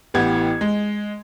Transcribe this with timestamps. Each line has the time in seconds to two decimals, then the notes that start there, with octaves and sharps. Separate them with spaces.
0.14 A1 E3 B3 G4 G#6
0.61 G#3